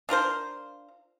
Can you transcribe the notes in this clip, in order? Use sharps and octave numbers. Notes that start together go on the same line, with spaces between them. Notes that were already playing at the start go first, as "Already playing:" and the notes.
D4 F4 A#4 C5